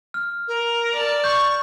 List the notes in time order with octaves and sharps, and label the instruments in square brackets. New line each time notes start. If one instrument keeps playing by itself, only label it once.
[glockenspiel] F6
[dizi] A#4
[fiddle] D5 A5
[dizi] C#6 [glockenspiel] G6